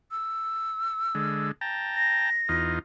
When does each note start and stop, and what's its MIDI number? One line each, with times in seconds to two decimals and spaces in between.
0.11 1.48 88
1.15 1.51 50
1.15 1.51 56
1.61 2.30 79
1.61 2.30 81
1.61 2.30 82
1.95 2.73 94
2.49 2.79 40
2.49 2.79 63
2.49 2.79 65